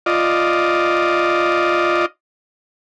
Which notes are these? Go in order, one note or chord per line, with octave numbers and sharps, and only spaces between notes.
F4 D5 D#5